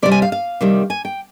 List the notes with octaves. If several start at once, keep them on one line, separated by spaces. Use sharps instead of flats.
C3 G3 D5
G#5
F5
F5
C3 D#3 G3
G#5
G5